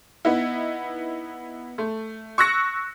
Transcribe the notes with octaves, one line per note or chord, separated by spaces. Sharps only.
B3 D#4 E4
A3
C#6 E6 F#6 A#6 C#7